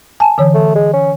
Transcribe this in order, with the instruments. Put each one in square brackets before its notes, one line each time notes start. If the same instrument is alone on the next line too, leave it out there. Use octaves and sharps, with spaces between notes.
[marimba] G#5 A5
D3 E3 C#5
[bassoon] A3
G#3
C#4